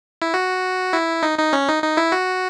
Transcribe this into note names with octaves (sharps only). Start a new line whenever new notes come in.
E4
F#4
E4
D#4
D#4
C#4
D#4
D#4
E4
F#4